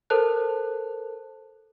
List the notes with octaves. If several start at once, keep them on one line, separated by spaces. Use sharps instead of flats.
A4 A#4 C5 A5 F#6